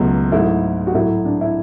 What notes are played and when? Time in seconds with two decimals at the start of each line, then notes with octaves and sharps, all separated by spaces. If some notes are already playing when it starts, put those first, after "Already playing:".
Already playing: C#2 B2 F#3 A3
0.32 G#2 F#3 A3 E4
0.87 F#4
0.94 A2 F#3 A3 E4
1.25 D4
1.41 E4